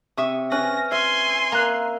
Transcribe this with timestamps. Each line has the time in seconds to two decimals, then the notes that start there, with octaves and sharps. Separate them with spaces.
0.17 C3 E5 C#6 D#6
0.52 C#4 B4 G#5 A#6
0.92 E5 G#5 C6
1.52 A#3 A#5 F#6